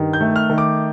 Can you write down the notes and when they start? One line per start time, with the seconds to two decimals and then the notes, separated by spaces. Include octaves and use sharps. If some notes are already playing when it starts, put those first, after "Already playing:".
Already playing: G2 D#3
0.13 G6
0.21 A3
0.36 F6
0.50 D#3
0.58 D6